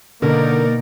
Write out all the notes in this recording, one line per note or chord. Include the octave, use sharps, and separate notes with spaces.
B2 D3 A#3 D#4 A#4 D5